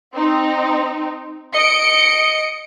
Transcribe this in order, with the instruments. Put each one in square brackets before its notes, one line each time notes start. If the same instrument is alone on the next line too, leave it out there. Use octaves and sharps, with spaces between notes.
[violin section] C4 D#4
[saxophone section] D#5 [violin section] C#7 D7